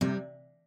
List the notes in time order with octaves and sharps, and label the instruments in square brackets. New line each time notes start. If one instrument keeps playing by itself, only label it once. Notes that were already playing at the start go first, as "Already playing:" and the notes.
[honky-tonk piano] C3 [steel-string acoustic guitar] G3